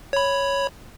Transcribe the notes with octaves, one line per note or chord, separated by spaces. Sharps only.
C#5 B5